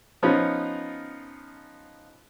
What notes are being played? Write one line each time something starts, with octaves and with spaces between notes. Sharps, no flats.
F3 B3 C#4 D#4 F4